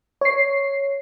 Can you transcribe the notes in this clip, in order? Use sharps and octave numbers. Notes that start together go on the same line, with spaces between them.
C#5 C7